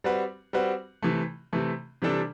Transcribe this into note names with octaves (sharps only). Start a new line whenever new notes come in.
G3 C4 F#4 B4
G3 C4 F#4 B4
C3 E3 A3
C3 E3 A3
C3 E3 G3 D4 A4